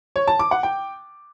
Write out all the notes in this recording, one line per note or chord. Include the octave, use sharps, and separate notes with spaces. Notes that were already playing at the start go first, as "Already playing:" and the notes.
C#5
A5
D6
F#5
G5